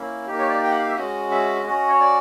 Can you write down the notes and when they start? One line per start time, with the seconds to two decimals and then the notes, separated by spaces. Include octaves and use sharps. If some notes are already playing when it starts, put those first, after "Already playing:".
Already playing: A#3 C#4 E4
0.26 A#3 D#4 G4
0.38 C#5
0.50 D5
0.64 G5
0.71 F#5
0.79 F5
0.88 E5
0.96 G#3 C#4 F#4 D#5
1.31 E5
1.66 C#4 F#4 D#5
1.89 C#5
2.00 D5